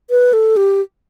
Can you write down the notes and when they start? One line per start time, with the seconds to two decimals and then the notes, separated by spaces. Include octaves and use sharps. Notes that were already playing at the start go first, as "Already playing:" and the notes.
0.10 B4
0.33 A4
0.57 G4